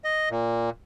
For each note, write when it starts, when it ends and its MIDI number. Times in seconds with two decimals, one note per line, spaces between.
0.04 0.29 75
0.30 0.70 46